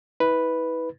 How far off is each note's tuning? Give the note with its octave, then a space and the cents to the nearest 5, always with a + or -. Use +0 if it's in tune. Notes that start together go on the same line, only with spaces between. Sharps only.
E4 -35 B4 +0